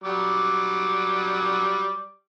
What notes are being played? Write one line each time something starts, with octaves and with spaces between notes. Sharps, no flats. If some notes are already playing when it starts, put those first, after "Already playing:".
F#3 G3 D6